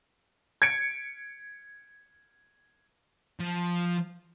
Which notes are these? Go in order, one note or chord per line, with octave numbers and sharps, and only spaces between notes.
G#6 C#7 D7
F3